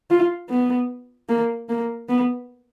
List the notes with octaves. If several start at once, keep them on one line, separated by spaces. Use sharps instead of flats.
F4
B3
A#3
A#3
B3